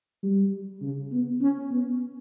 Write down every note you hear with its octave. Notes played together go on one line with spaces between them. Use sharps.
G3
C#3
B3
C#4
B3